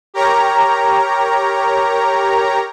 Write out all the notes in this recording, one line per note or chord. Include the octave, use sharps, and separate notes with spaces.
G4 A#4 C#5 A#5